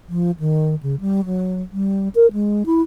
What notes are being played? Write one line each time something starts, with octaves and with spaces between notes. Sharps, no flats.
F3
D#3
C#3
G3
F#3
G3
A#4
G#3
E4